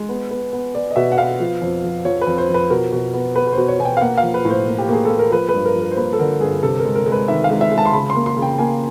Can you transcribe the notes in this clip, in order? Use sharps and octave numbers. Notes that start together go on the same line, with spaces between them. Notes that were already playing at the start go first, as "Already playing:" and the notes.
Already playing: G#3
B3
B3
B3
B3 D5
D#5
B2 E5
F#5
B3 F5
F3
F2
F3
F3 C#5
B4
F2
C5
F3
B4
B2 A#4
B2
B3
B3 B4
B4
C5
B2
C#5
B2 G#5
G5
F5
A#3 F#5
F5
F3
B4
A2
C5
A#3
G4
A#3 G#4
A#3 A4
A#4
F3 B4
B4
G2
A#4
F3
A#4
C5
A#3 B4
A4
D3 A#4
G2 G#4
C3 A4
G#3 A#4
A#4
G#3
B4
D#3 E5
F5
G#3
E5
G#3
A5
C6
C#3 B5
C6
A#3
C6
C#3
G5
A#3 G#5